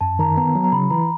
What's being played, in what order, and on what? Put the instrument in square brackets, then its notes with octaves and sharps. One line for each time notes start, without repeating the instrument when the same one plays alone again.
[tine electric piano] F#2 [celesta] A5
[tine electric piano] D#3 [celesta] A#5
[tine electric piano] B3 [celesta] A#5
[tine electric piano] F#3
[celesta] A#5
[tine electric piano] C#3 [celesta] B5
[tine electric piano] E3 [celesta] A#5